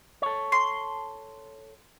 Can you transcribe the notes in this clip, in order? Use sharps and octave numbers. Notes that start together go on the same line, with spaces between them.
A4 C#5
C6